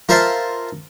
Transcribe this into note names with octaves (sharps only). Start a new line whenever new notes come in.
F4 A#4 C5 E5 F5 A5